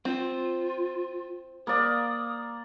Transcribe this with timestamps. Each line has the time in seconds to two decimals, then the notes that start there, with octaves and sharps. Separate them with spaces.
0.05 C4 F4
1.67 A#3 D5 D#6